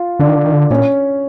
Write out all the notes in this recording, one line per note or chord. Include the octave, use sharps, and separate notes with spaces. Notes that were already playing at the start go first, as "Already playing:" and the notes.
Already playing: F4
D3 D4
D#3
D3
D#3
D3
A#2 C#4